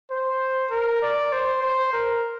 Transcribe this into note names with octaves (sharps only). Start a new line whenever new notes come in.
C5
A#4
D5
C5
C5
A#4